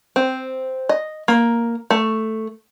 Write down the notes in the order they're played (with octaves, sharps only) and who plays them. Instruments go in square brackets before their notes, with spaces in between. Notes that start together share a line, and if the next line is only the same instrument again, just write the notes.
[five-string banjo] C4
D#5
A#3
A3